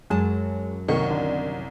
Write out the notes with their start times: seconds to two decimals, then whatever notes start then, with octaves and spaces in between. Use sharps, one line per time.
0.10 F#2 F#3 G#3 A5
0.88 C2 D#3 C#6
1.11 D3